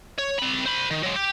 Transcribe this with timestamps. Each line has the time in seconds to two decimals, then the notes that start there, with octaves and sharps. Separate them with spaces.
0.19 C#5
0.39 C4 B5
0.66 C5 B5
0.91 D#3
1.03 F#3 G#3
1.16 G4